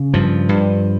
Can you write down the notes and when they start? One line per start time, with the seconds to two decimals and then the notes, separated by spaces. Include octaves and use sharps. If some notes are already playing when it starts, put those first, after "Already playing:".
Already playing: C#3
0.14 G2 F3
0.49 G2